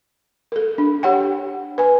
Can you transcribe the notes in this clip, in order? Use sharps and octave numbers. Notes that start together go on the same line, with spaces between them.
A4 A#4
D4
G4 C#5 F#5 G5
B4 G#5